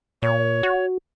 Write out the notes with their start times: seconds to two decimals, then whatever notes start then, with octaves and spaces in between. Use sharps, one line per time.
0.22 A#2 C#5
0.63 F#4